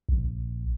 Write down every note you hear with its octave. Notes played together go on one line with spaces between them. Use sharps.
A#1